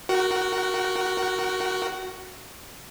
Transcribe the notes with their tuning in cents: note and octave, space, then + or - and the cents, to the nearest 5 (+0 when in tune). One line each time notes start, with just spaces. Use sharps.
F#4 +0 A#4 +0 F#5 +45